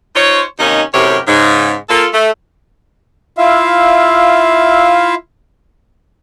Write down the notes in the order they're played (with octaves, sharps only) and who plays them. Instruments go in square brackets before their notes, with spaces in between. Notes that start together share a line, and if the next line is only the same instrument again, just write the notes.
[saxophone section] D#4 F4 C5 C#5
D#2 C3 A#3 C#4 D#4
F#2 A2 C3 G4 A#4 C#5
G#2 C#3
A#3 F4 A4
A3
[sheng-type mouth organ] E4 F4 E5 F5